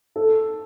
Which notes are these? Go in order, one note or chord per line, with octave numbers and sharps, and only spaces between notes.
A4